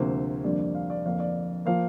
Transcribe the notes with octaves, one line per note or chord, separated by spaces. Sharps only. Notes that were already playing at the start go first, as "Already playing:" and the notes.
Already playing: D2 C3 F3 A#3 C5
F2 D3 G3 A#3 D5
D5
F5
D5
F2 D3 A#3 F5
D5
F3 A#3 F5